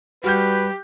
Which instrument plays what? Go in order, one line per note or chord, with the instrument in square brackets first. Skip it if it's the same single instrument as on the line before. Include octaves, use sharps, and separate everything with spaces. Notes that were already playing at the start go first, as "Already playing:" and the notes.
[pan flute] G3 [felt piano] F#4 F6 G6 [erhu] G4 [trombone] B4